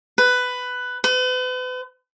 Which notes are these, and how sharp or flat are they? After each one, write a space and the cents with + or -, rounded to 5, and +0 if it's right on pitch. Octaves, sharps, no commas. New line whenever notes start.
B4 +10
B4 +40